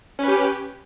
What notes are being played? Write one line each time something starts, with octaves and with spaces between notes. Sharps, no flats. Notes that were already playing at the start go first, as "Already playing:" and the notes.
C#4 G4 B4